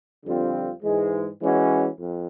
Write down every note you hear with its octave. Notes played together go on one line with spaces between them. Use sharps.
F2 D3 G3 C4 F4
G#2 E3 G#3
E3 G#3 C#4 F#4
F2